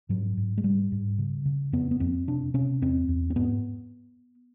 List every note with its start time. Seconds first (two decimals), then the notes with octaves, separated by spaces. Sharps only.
0.09 G#2 F#3
0.37 G#2
0.58 G#3
0.64 G#2 G3
0.92 G#2
1.18 C#3
1.46 C#3
1.72 F2 B3
1.91 B3
2.00 F2 C4
2.28 C3 D4
2.54 C3 C#4
2.82 E2 C4
3.09 E2
3.30 C4
3.36 G#2 B3